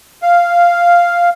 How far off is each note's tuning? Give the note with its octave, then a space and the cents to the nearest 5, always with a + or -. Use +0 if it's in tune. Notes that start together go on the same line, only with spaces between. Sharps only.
F5 -5